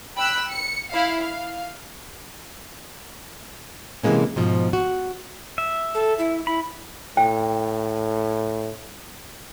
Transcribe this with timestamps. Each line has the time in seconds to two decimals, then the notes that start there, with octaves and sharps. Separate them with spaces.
0.16 G5 B5 E6 F#6
0.50 C#7
0.91 E4 F5
1.21 F5
4.03 C3 E3 F#3 G#3 A#3 C#4
4.36 G#2 B2 F3
4.73 F#4
5.58 E5
5.95 A4
6.19 E4
6.47 E4 B5
7.17 A2 G5